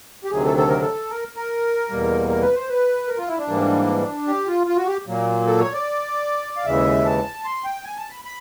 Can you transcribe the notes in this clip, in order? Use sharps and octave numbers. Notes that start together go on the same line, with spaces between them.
G4
D2 C3 D#3 F#3 G#4
A4
A4
A#4
A4
A#4
A#4
E2 B2 G3 A#3
A#4
B4
C5
B4
A#4
F4
E4
D4
G#2 E3 G3 A#3
G4
F4
F4
F#4
G4
A#2 F#3 A#3
A4
C#5
D5
F5
D#2 C#3 E3 G#3 E5
A5
C6
G5
G#5
A5
B5
B5